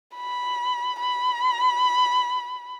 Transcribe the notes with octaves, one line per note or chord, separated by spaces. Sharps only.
B5
B5